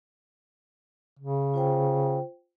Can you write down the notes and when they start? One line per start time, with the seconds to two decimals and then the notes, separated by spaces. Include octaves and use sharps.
1.19 C#3
1.54 F4 C5 G5